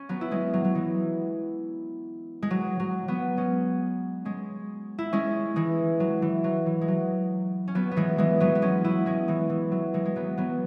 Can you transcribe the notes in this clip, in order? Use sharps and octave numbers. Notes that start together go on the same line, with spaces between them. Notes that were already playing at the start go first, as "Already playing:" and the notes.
Already playing: C#4
F#3 B3
E4
G#3 C#4
F#3
F#3
E3 G#3
G#3
F#3
F#3
F#3 B3
G#3 C#4
G#3 C#4
E4
G#3 C#4
E3 G#3
F#3
E3
F#3
E3
G#3
F#3
C#4
F#3 B3
B3
E3 G#3
E3 G#3
F#3 B3
B3
G#3 C#4
B3 E4
G#3 C#4
E3 G#3
E3
F#3
E3 G#3
G#3
F#3 B3
F#3 B3